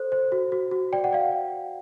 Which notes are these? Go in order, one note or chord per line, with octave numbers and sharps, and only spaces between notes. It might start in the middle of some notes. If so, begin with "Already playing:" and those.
Already playing: A4 C5
C5
F#4
F#4
F#4
D5 G5
F#5
D5 F5